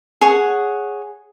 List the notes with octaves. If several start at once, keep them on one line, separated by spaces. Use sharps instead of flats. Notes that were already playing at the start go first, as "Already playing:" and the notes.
G#4 C#5 F#5